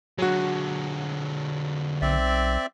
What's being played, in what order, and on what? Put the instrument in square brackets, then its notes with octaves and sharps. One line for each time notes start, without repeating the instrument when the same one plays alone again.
[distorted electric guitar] D3 G#3 [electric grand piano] F#3 F#4
[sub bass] B1 [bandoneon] C4 D5 E5